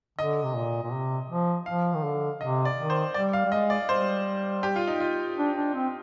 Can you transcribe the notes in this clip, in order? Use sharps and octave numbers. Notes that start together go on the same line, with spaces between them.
D3 D#5
C3
A#2
A#2
C3
F3
F3 F5
D#3
D3
C3 D#5
D5
D#3
C5
G3 D5
F5
G3
G#3 D#5
D5
G3 C5
G4
F4
D#4
F4
D4
D4
C4